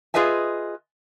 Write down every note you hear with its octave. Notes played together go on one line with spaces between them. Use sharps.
F4 G#4 B4 D#5 E5 G#5